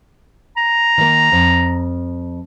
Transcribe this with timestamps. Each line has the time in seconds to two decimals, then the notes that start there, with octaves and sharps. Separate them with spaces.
0.57 A#5
0.98 D#3 A#3
1.32 F2